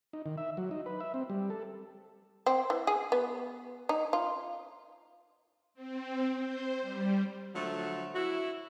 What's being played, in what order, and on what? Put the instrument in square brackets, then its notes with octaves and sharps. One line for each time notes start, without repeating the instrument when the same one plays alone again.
[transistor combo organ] D#4
D#3
E5
F#3
D#4
B4
E5
C4
G3
A4
[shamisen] C4
E3
G#4
B3
D#4
F4
[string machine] C4
C5
G3
[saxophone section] D3 F3 F#3 A3
E4 F#4